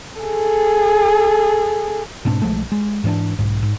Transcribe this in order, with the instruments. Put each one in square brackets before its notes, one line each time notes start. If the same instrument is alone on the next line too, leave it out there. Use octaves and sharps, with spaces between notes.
[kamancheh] G#4 A4
[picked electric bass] G#2 B2 C4 D4
B1 F3 G#3 A3
G#3
G#2 E3 C#4 D4
B1 G#2
G#2